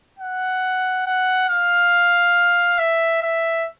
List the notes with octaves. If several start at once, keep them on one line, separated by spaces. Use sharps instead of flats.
F#5
F#5
F5
E5
E5